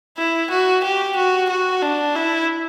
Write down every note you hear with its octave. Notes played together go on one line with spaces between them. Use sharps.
E4
F#4
G4
F#4
F#4
D4
E4